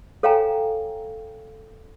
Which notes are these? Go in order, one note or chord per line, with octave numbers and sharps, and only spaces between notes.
A4 C#5 F5 G5 G#5 A#5